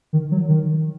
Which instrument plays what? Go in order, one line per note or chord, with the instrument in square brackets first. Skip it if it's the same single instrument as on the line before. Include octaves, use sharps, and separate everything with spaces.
[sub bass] D#3
F#3
D#3